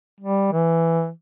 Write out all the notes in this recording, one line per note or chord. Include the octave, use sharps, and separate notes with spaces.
G3
E3